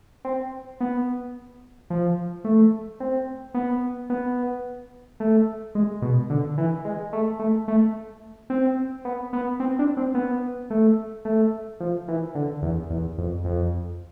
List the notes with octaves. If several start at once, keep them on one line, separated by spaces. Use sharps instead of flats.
C4
B3
F3
A3
C4
B3
B3
A3
G#3
B2
D3
E3
G#3
A3
A3
A3
C4
B3
B3
C4
D4
C4
B3
A3
A3
F3
E3
D3
E2
E2
F2
F2